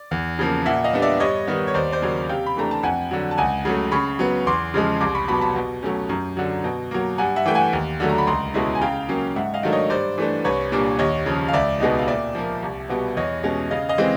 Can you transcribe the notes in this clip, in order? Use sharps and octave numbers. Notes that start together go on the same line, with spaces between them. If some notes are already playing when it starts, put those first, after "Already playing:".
Already playing: D5
E2
C#3 F3 A#3
A#2 E5 F#5
D#5 F5
G3 B3 D4
D5 E5
G2 C#5 D#5
D#3 G3 B3 D#4
C#5
D#2 C5 D5
C5 D5
C#3 F#3 A#3 C#4
C3 F5 G5
B5
E3 A3 D4 A#5
A5
F2 F#5 G#5
D3 F#3
A5
C#2 F#5 G#5
C#3 F#3 A3
C#3 B5 C#6
F#3 B3
E2 C6 D6
C#3 F3 G#3
C2 C6 D6
B5 C#6
B2 F#3 B3 A5 B5
A5 B5
B2
F#3 A3 C#4
F#2
D3 F#3
B2
F#3 A#3
G2 F#5 G#5
E5 F#5
E3 A3 G5
F#5 G#5
D#2
D3 F#3 A3
A#5
B5
C#2 A#5 C6
B2 G#3 C#4 E4
G#5
C#3 F5 G5
F#3 A#3 C#4
G#2 E5 F#5
D#5 F5
D#3 F#3 A3 D4
C#5 D#5
G2 C5 D5
E3 A3 D4
C2 B4 C#5
A#2 G3 A#3 D4
D#2 C#5 D#5
C#3 F3
F5
C#2 D5 E5
B2 G#3 B3 D#4
F5
A#2 D5 E5
F3 A#3
C2
B2 G3 B3
E2 C#5 D#5
B2 G#3 C#4
C#3 D#5 F5
D#5 F5
E3 G#3 C4